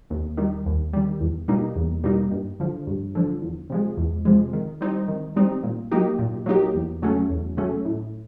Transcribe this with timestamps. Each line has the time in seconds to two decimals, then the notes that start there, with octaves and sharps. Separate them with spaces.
0.10 D#2
0.37 D#3 G3
0.66 D#2
0.93 D#3 G3
1.21 E2
1.48 B2 G3 A#3 D#4
1.76 E2
2.04 B2 G3 A#3 D#4
2.31 G2
2.60 D3 F3
2.87 G2
3.15 D3 F3
3.42 E2
3.70 C3 F3 G#3
3.97 E2
4.25 C3 F3 G#3
4.53 D#3
4.81 G3 C4 D#4
5.08 D#3
5.36 G3 C4 D#4
5.63 A#2
5.91 F#3 A#3 D#4 G4
6.19 A#2
6.46 F#3 A#3 D#4 G4
6.74 E2
7.02 C#3 F#3 A3 C#4
7.30 E2
7.57 C#3 F#3 A3 C#4
7.85 A2